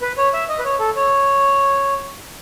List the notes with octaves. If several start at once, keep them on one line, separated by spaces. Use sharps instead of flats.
B4
C#5
E5
D#5
B4
C#5
A4
C#5